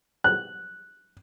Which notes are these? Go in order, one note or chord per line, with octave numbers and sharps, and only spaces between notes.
F#6